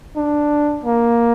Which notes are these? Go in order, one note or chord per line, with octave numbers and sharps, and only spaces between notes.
D4
A#3